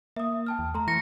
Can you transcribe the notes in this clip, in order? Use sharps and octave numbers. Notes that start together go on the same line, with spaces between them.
A#3 E5 D#6
G5 A5 F6
E2
A3 A#5 C6
E3 C#6 A#6 C#7